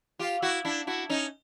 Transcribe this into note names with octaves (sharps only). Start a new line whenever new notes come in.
F4 G4
E4 F#4
D4 E4
E4 F#4
C#4 D#4